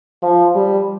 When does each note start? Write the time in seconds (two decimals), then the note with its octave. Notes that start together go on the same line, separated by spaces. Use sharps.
0.23 F3
0.55 G3